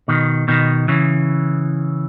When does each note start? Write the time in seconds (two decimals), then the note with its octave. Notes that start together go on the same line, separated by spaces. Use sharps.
0.08 B2 D#3
0.48 B2 D#3
0.88 C#3 E3